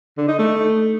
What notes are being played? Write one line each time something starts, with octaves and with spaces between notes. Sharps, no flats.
D3
D#4
A3